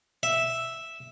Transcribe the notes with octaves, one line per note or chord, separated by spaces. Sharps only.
E5